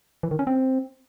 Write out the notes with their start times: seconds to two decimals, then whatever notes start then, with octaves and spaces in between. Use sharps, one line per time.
0.23 E3
0.31 D#3
0.39 C#4
0.47 C4